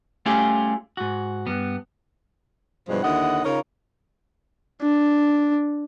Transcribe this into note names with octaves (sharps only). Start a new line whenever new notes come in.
G3 A3 C#4 F4 G4 G#4
G#2 F#4
G2 B3
G2 B2 E3 F3 G3 G#3
D#2 D3 E4 D#5 F#5
C#3 D#4 F4 A#4 C#5
D4